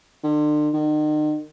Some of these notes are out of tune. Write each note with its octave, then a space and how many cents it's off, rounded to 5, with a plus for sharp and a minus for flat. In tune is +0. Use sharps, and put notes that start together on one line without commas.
D3 +40
D#3 -40